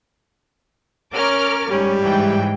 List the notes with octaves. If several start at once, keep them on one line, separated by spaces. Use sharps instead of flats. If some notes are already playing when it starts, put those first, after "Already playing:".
C#4 A#4 D6 F6
G#2 G3 C#4
G#2 E3 G5